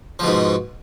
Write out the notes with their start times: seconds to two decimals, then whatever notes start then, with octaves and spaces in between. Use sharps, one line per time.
0.19 F3
0.23 B2
0.27 G#2